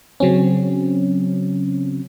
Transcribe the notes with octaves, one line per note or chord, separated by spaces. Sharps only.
C#3 F#3 C4 C#4